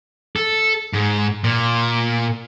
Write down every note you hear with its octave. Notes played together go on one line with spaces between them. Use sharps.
A4
G#2
A#2